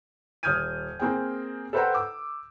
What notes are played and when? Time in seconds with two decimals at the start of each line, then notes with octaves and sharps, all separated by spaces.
0.43 D#1 D#6 F6 G6 G#6 D#7
1.00 A#3 C4 G#4 G5
1.73 A4 B4 C5 F#5 G5 A#5
1.94 D6 E6